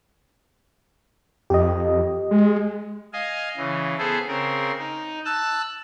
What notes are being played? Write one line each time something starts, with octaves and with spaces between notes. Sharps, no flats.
F2 G4 D#5
G#3
D#5 F5 G#5
C#3 E3
B3 G#4 A4 C5
C#3 C4 A#4
D#4
A5 E6 F#6